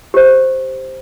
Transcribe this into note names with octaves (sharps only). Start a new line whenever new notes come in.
G4 C5